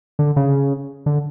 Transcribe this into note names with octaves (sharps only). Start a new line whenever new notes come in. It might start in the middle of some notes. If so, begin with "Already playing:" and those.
D3
C#3
D3